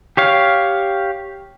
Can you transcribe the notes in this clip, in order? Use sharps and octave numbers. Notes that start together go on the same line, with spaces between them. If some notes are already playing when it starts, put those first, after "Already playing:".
G4 C#5 F5